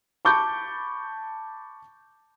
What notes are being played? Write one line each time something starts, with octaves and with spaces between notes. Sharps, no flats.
A5 B5 C#6 D6 G6